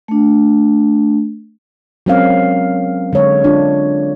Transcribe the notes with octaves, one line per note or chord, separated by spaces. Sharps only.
A3 D4
F#3 G#3 C4 C#4 A#4 F5
D3 G#3 C#5
D4 F4